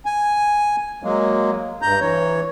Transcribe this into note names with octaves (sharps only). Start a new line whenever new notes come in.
G#5
F#3 G#3 A#3
G2 A#5 G6
E3 C#5